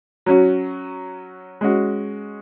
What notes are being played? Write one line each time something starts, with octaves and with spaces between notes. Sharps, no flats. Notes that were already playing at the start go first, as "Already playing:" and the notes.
F#3 C#4 F#4
G#3 C#4 F#4